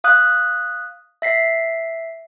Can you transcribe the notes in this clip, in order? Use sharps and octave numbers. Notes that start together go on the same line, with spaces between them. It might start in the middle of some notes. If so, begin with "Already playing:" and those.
F5 D#6 F#6
E5 B6 C7